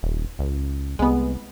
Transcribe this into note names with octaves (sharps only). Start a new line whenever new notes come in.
D#1
C#2
C2 G#3 B3